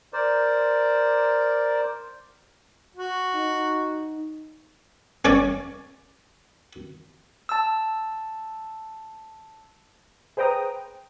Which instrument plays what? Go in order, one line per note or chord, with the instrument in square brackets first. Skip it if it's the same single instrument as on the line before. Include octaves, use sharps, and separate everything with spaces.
[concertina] A#4 C5 D5
[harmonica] F#4
[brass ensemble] D#4
[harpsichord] C#4 C#5 D5
[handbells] A5 E6
[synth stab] G#4 B4 C5 G5 A#5 D#6